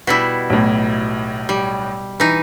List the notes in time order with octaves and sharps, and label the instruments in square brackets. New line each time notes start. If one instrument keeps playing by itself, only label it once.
[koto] B2 G3 E4 [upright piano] F#5 B6
[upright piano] B1 A2
[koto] G3
E3 D#4